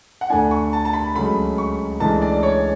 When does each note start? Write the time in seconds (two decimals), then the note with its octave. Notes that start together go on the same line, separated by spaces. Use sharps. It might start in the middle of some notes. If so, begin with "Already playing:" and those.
0.21 F#5
0.30 D2 D3 A3 D4 G#5
0.51 C#6
0.73 A5
0.85 A5
0.93 B5
1.15 C#2 C#3 F#3 A3 B5
1.58 C#6
2.00 C#2 C#3 E3 A3 D4 A5
2.22 D5
2.43 C#5